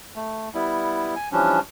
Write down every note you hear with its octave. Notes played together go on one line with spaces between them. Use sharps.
A3
G3 B3 E4
G#5
E3 F3 G3 C#4 D4